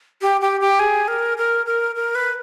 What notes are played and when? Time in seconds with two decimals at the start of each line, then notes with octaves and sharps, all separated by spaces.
0.22 G4
0.41 G4
0.61 G4
0.79 G#4
1.08 A#4
1.38 A#4
1.66 A#4
1.95 A#4
2.15 B4